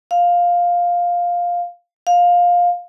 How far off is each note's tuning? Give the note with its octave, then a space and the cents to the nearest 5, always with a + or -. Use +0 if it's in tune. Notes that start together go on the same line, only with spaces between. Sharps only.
F5 +5
F5 +15